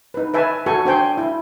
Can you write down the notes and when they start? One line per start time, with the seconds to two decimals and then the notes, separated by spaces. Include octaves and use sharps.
0.14 D#4 B4
0.34 B4 E5 G#5 A5
0.66 F#4 A4 G#5 C#6
0.85 D4 C5 G5 G#5
1.18 E4